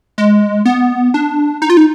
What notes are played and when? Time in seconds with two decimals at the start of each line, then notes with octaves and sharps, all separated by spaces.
0.18 G#3
0.66 B3
1.14 D4
1.62 D#4
1.70 F4
1.77 D#4